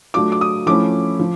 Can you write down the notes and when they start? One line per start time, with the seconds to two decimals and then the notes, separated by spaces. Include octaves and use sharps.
0.14 F#3 A3 D4 F4 D6
0.32 D6
0.41 D#6
0.66 F3 A3 C#4 E4 D6
1.19 F3